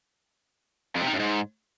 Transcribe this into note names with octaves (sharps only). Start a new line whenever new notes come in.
F2
C3
D#3
F#2
G#2